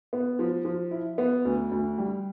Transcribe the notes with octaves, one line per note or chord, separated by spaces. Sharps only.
B3
F3
F3
E4
B3
D2
D2
G3